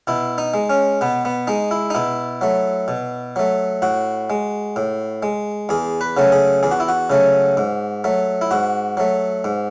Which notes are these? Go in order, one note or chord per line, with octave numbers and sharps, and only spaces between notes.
B2 E4
D#4
G#3
C#4
B2 B3
B3
G#3 D#4
E4
D#4
B2 E4
F#3 A3
B2
F#3 A3
A2 F#4
G#3
A2
G#3
E2 G#4
B4
C#3 F#3 A3
G#4
E2 G#4
F#4
E4
F#4
C#3 F#3 A3
G#2
F#3 A3
E4
G#2 F#4
F#3 A3
G#2